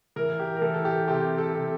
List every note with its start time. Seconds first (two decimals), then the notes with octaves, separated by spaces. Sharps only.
0.16 E3 A#4
0.39 G4
0.57 A#4
0.62 E3 A4
0.74 A4
0.85 G4
1.08 C3 G4
1.38 A4
1.53 C3